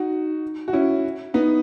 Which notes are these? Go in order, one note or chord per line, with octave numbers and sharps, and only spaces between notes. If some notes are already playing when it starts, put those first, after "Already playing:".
Already playing: D#4 F#4
F#4
C#4 E4
B3 D#4